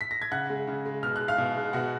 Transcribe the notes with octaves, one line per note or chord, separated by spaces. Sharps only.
B6
A#6
G#6
C#3 F#5 F#6
G#3
C#3
G#3
B2 F6
G#3 F#6
F5 F6
B2
G#3
B2 F#4 F#5